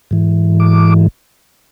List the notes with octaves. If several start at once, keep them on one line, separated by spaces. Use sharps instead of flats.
G#2 E3
D6